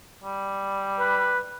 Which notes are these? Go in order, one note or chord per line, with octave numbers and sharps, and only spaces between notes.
G3
B4